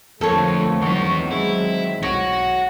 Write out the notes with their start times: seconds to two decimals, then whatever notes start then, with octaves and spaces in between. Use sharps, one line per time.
0.21 F2 D3 F3 A3 A4 A#4 C#5
0.82 D#3 E3 F#3 B3 C4 F#5 C#6
1.31 G#3 E4
2.03 B1 F#4 C#5 A#6 D7